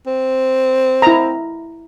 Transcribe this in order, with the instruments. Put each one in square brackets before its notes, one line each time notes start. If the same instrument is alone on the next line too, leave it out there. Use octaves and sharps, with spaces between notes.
[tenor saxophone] C4
[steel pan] E4 A#5